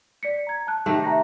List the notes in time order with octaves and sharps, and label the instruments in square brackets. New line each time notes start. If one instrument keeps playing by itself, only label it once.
[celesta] D5 B6 C#7
A#5 G#6
A5 F#6
[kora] C3 D#3 A3
[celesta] E5 A#5 A#6